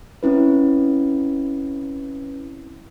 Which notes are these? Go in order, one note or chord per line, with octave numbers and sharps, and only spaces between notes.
C4 C#4 E4 B4